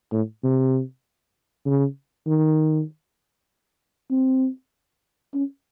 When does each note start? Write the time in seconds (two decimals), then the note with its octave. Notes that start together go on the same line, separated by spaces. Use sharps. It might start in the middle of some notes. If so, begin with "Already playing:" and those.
0.12 A2
0.44 C3
1.65 C#3
2.27 D#3
4.11 C4
5.34 C#4